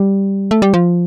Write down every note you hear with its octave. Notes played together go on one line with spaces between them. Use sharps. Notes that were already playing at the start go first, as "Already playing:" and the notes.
Already playing: G3
A3
G3
F3